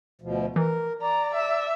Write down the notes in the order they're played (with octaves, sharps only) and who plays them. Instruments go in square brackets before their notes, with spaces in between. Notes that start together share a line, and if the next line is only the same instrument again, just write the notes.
[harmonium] D2 B2 F3
[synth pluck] E3 [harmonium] A#4
[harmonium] D5 [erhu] A#5
[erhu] E5